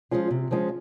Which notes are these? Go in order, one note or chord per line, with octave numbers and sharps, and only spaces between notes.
F3 G#3 C#4 F4
C3
F3 G#3 C#4 F4